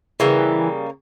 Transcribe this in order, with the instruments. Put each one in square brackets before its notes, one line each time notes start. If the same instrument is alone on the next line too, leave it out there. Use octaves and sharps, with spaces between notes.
[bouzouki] C#3 G3 A#3 [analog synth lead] E3